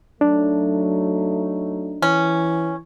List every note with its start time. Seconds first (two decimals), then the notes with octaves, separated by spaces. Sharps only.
0.21 F#3 A3 D4 D#4
2.02 E3 C#4